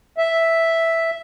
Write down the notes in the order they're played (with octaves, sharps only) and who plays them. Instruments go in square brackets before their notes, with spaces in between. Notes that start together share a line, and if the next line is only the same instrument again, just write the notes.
[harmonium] E5